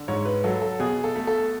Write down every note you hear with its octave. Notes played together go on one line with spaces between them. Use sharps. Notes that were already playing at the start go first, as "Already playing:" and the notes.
Already playing: D3
G#2 C#5
B4
F#3 A4
A4
B2 G#4
A4
A3
A4